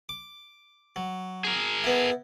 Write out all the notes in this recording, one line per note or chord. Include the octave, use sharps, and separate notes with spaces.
D6
F#3
G#4 A#4
B3 E4